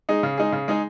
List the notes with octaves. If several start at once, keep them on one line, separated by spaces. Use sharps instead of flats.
G#3 D#4 G#4
C#3
G#3 D#4 G#4
C#3
G#3 D#4 G#4